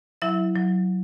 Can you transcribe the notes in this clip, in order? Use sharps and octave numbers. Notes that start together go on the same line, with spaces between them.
F#3 E4 E5
F#3